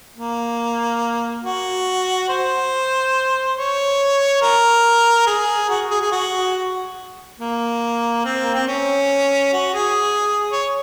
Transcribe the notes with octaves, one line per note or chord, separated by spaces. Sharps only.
A#3
F#4
C5
C#5
A#4
G#4
F#4
G#4
G#4
F#4
A#3
C4
A#3
C4
C#4
F#4
G#4
C#5